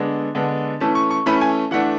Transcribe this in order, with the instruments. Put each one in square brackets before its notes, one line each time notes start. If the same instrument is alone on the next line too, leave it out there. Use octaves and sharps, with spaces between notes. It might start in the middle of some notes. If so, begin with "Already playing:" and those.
Already playing: [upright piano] D3 G#3 B3 D4
D3 G#3 B3 D4
E3 A3 C#4 A5
C#6
C#6
E3 A3 C#4 B5
G#5
E3 A3 D4 F#5